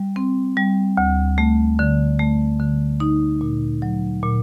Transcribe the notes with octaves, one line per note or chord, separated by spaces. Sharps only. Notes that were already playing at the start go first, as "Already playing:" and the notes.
Already playing: G3
C4
G3
D2
A3
D3
A3
D3
D#4
A#2
F#3
A#2